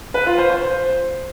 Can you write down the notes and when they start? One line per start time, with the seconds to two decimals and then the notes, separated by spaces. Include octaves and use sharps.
0.14 B4
0.26 F4
0.38 C5
0.50 C5